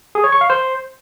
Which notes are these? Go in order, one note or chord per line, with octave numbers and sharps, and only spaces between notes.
G#4
C#5
C#6
F5
C5